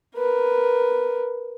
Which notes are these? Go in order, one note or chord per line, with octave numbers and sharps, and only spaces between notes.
A#4 B4